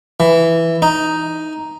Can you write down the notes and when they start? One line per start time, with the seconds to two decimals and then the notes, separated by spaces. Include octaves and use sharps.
0.20 E3
0.82 D#4